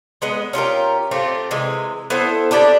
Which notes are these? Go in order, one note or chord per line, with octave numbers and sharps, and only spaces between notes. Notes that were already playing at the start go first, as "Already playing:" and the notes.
G#3 B3 D#5
C#4 F4 G4 A#4
A3 C4 F4 G4
C3 E3 G#3
B3 E4 A4 C5
D4 E4 G4 D5